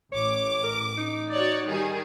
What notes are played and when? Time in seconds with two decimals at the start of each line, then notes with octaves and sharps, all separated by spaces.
0.12 A1 C#5 D6
0.64 A#4
0.98 D#4
1.31 F#4 C#5 D5
1.67 D#3 G3 G#4